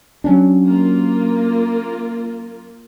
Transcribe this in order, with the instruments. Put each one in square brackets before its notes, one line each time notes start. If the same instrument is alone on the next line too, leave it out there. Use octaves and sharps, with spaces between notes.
[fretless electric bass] F#3 C#4 D4
[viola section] A#3 F4 A#4